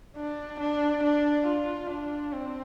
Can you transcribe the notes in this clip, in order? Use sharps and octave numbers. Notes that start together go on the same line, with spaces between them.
D4
D4
D4
F4
D4
C4